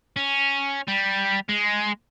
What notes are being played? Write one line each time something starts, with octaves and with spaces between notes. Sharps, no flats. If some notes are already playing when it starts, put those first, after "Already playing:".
C#4
G3
G#3